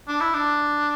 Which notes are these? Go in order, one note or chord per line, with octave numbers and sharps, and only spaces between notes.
D4
E4
D4